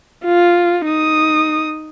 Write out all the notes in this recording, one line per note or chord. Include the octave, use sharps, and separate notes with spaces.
F4
D#4 D#6